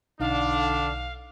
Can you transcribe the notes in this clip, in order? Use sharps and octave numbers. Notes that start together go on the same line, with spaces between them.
B1 D3 D4 D#4 F5